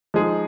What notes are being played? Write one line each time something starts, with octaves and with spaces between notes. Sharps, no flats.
F3 G#3 D#4 G#4